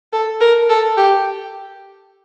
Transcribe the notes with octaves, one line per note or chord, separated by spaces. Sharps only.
A4
A#4
A4
G4